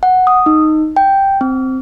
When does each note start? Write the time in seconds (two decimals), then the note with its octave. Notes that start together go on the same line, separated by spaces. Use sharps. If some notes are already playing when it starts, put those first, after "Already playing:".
0.03 F#5
0.27 D#6
0.46 D#4
0.96 G5
1.41 C4